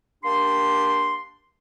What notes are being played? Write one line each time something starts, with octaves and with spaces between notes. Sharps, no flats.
A#3 D4 G4 C6